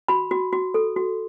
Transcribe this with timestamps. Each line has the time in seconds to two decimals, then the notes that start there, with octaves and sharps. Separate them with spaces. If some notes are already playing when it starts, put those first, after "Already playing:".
0.08 F#4 B5
0.31 F#4
0.53 F#4
0.74 A4
0.96 F#4